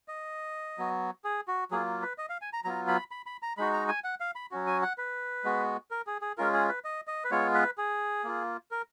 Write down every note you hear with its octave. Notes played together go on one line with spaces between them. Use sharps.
D#5
F#3 B3 F#4
G#4
F#4
F#3 A#3 F4 G#4
B4
D#5
F5
G#5
A#5
F#3 B3 F4 A#5
B5
B5
B5
A#5
G#3 D#4 F#4 B5
A#5
G#5
F#5
F5
B5
F#3 C#4 F#4
G#5
F#5
B4
G#3 B3 F#4
A#4
G#4
G#4
G#3 C#4 F4 A#4
G#4
B4
D#5
D#5
B4
G#3 B3 F4 C#5
B4
G#4
A#3 F4
A#4